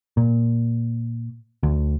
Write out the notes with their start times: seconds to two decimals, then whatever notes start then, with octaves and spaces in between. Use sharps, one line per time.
0.17 A#2
1.63 D2